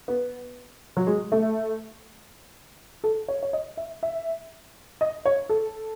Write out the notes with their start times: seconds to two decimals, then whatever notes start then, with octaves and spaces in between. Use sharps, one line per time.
0.08 B3
0.97 F#3
1.07 G#3
1.32 A3
3.04 A4
3.28 C#5
3.43 C#5
3.53 D#5
3.77 E5
4.03 E5
5.01 D#5
5.25 C#5
5.49 A4